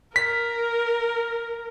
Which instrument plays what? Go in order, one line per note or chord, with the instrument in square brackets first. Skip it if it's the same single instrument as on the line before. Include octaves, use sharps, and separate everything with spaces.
[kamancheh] A#4 [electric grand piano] B6